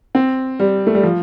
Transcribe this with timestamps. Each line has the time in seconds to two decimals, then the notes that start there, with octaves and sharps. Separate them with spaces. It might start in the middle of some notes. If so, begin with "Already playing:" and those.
0.15 C4
0.59 G3
0.87 A3
0.95 G3
1.03 F3